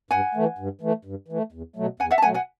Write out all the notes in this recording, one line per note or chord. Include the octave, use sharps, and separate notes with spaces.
G2 F#5 G#5
E3 A3
G2
E3 A3
G2
E3 A3
E2
B2 F#3 A3
E2 F#5 G#5
E5 F#5
A5
B2 F#3 A3 F#5 G#5
F#5 G#5